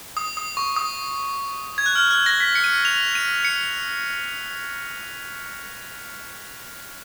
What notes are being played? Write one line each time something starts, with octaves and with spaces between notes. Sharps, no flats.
D#6
D#6
C#6
D#6
G#6
F#6
F6
F#6
A#6
B6
C#7
D#7
C#7
F7
D#7
C#7